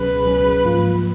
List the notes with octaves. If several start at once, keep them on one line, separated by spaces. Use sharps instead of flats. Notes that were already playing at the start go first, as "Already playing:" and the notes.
Already playing: C#2 B2 F#3 C#4 G#4 B4
C#2 B2 F#3 C#4 G#4
G#2 F3 A#3 F4